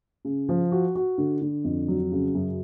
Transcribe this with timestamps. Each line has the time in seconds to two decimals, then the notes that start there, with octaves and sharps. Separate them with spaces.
0.25 C#3
0.49 F3
0.72 F#4
0.95 F#4
1.18 D3
1.41 D3
1.64 F2
1.88 F#3
2.12 C#3
2.35 F#2